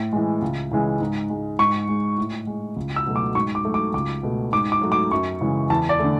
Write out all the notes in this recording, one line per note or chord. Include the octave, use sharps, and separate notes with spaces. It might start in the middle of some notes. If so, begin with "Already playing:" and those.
Already playing: A2
E3 G#3
C#2
C#3 E3 G#3
G#2
G#3
G#2 C#6
G#3
A2
G#3
C#2
E6
B2 F#3 A3
D6
G#2 C#6
D6
F#3 A3
D6
C#2 D6
B2 A3
G#2 D6
D6
F#3 A3
D6
F#2 C#6
C#3 E3 G#3
E2 A5
D5
D3 A3